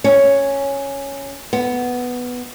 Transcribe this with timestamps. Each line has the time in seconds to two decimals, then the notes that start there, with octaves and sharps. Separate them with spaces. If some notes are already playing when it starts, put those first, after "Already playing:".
0.04 C#4
1.53 B3